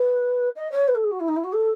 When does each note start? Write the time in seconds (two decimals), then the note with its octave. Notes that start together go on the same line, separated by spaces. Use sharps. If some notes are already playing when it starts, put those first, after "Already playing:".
Already playing: B4
0.55 D#5
0.71 C#5
0.87 B4
0.94 A4
1.03 G#4
1.11 F#4
1.19 E4
1.28 D#4
1.36 E4
1.43 F#4
1.52 A4